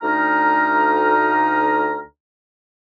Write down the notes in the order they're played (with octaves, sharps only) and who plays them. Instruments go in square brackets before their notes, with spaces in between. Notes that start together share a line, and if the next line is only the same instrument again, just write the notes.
[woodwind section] D2 D#4 A#5 F6